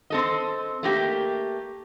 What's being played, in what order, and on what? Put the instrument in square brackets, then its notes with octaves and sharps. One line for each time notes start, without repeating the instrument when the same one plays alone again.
[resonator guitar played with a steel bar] C4 A4 D#5
A3 A#3 G4